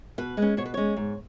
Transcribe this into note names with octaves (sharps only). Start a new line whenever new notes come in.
B2 B4
G#3 C#4
B2 C#5
B4
G#3 C#4 C#5
G#2